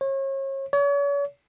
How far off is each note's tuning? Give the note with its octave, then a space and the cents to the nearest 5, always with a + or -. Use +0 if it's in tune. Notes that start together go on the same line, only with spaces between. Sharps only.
C#5 -35
C#5 +40